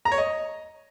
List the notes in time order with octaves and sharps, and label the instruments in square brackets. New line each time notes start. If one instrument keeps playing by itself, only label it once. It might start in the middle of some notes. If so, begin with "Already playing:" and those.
[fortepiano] A#5
C#5
D#5